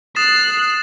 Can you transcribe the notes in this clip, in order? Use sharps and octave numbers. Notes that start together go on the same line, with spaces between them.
D#6 F#6 A6 C7 E7